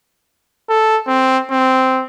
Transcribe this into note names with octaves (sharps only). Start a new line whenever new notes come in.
A4
C4
C4